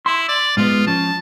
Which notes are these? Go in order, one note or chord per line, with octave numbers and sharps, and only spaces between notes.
E4 C6
D5
G#2 G#3 B3 F4
F3 C#4 A5